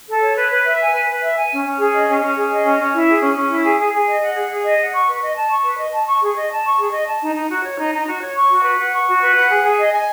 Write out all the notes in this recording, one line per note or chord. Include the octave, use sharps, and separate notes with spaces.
A4
C#5
B4
B4
E5
G#5
B4
B4
E5
G#5
C#4
C#4
G#4
D#5
C#4
C#4
G#4
D#5
C#4
C#4
E4
G#4
C#4
C#4
E4
G#4
G#4
G#4
D#5
F#5
G#4
G#4
D#5
F#5
C#6
B4
D#5
A5
C#6
B4
D#5
A5
C#6
G#4
D#5
A5
C#6
G#4
D#5
A5
D#4
D#4
F#4
C#5
D#4
D#4
F#4
C#5
C#6
F#4
B4
F#5
C#6
F#4
B4
F#5
G#4
G#4
D#5
G#5